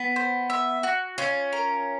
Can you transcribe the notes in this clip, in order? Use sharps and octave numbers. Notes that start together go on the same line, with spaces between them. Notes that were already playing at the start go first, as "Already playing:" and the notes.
Already playing: B3
C5
E5
F#4
C#4 F4
A#4